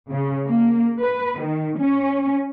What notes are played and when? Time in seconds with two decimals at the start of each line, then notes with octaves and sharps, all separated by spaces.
0.11 C#3
0.48 A#3
1.01 B4
1.40 D#3
1.79 C#4